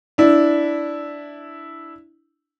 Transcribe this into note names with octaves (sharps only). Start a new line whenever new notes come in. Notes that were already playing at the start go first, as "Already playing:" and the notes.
D4 E4